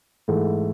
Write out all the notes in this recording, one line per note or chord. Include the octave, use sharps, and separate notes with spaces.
G#2 E3 A3